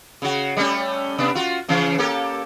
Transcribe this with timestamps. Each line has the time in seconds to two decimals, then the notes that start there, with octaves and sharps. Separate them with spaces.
0.22 C#3 F#4
0.57 G3 A3 C#4
1.18 C3 B3 D4
1.35 F4 F#4
1.68 C#3 E3 C#4
1.98 A#3 G4 A4